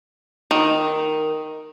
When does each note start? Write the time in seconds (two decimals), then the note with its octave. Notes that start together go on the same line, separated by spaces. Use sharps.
0.51 D#3